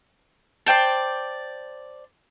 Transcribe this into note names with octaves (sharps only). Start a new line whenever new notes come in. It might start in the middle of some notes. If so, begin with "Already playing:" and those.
C5 D5 G5 A5